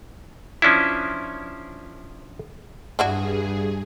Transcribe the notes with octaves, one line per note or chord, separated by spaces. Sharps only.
F3 C#4 D4 E4
G2 D4 E4 F#4 G#4